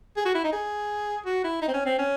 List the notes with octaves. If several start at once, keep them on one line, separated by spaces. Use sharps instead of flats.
G#4
F#4
E4
D#4
G#4
F#4
E4
D#4
C4
C#4
C4
C#4